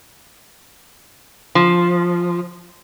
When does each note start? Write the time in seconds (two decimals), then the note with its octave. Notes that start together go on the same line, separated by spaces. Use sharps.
1.55 F3